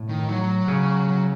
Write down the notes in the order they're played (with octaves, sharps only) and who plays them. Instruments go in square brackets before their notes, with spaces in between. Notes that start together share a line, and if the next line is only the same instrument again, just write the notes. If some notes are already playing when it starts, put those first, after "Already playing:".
Already playing: [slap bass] A2
[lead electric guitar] D#3
F#3
[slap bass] C#3
[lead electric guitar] F#3